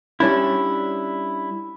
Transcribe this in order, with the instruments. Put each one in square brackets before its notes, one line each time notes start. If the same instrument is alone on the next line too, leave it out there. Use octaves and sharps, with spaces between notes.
[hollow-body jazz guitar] G3 C#4 D4 E4